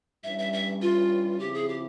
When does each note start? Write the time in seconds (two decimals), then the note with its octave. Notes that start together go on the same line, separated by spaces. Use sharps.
0.24 G2 E3 G3 C#4 E4 E5
0.38 E5
0.53 E5
0.82 F4
1.39 C#3 F3 C4 E4 G4
1.54 G#4
1.68 G4